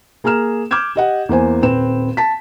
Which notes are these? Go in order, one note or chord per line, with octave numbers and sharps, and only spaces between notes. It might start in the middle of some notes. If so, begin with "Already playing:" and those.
A#3 G#4 A#5 F6 E7
D6 F6 G6 G#6 E7
G4 D#5 F#5
E2 A#3 C5 G#5
D#1 C4 B4 E7
A5 B6